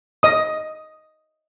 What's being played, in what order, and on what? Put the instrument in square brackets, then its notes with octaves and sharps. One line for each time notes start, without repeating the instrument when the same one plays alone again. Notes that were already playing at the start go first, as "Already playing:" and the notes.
[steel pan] D#5 D#6